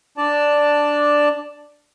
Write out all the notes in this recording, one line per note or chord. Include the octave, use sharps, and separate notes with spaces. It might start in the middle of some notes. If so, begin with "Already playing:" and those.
D4 D5 A5